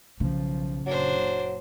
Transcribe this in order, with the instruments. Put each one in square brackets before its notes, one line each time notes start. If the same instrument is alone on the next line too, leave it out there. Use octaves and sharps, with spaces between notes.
[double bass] B1 F3 [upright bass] C#3
[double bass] F#1 A#2 [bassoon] F#3 [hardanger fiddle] D4 C5